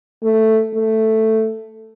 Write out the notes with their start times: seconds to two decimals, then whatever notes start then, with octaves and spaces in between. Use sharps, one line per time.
0.23 A3
0.75 A3